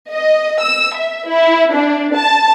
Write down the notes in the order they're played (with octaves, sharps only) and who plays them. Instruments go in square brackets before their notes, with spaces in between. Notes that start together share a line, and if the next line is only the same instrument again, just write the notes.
[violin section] D#5
E6
E5
E4
D4
A5